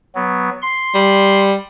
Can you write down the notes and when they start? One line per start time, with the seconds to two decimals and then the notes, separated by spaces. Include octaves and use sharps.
0.15 F#3 B3
0.62 C6
0.94 G3